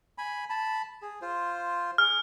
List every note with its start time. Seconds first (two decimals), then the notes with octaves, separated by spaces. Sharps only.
0.18 G#5 B5
0.50 A5 B5
1.02 G#4
1.22 F4 C5
1.98 G#4 F6